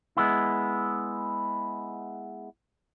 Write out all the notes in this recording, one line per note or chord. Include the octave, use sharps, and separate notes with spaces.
G#3 B3 E4